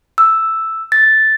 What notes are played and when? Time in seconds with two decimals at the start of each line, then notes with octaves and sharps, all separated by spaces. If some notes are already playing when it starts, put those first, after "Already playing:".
0.18 E6
0.92 A6